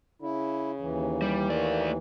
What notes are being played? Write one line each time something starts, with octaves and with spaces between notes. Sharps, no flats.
C#3 E4
D#2 E3
G3
A3 A#3 D5